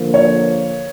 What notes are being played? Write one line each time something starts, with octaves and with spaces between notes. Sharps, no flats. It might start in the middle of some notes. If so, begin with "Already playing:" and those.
Already playing: D3 F3 A#3
C#5